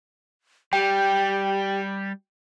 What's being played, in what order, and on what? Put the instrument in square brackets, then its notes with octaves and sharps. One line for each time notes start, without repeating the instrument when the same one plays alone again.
[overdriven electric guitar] G3 [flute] G4 [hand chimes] G5